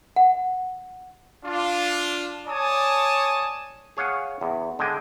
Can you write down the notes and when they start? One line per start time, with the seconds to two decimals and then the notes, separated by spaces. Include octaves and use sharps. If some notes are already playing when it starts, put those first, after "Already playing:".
0.16 F#5
1.44 D4 F4
2.48 C#5 D5 G#5 A5 D#6
3.97 G#4 C#5 F5 F#5 G#5
4.41 E2
4.79 D3 G#3 G5 G#5